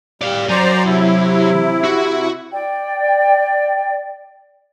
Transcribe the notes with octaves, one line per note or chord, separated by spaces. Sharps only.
G3 D5 F5
F#3 C5 D5 G#5 A#5
C3 E4
F#4
D5 G5